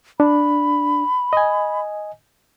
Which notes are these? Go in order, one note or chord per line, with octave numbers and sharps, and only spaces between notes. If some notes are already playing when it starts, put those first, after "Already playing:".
D4 B5
D#5 G#5